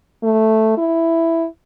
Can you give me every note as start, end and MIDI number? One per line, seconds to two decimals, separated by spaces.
0.23 0.78 57
0.78 1.47 64